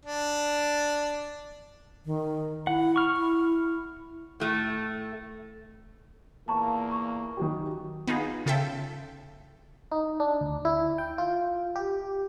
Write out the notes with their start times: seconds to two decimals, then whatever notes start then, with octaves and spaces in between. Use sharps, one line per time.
0.05 D4
2.05 D#3
2.67 E4 F#5
2.96 C#6 F6
3.17 E4
4.40 A2 A3
6.48 E2 A#2 A#3 A5 A#5 C#6
6.92 C#6
7.37 D#3 F#3 G4
8.07 B3 D#4 F4 G#4
8.46 C#3 F4 A4 E5 G5
9.92 D#4
10.20 D4
10.41 D2
10.65 E4
10.98 G5
11.18 F4
11.76 G4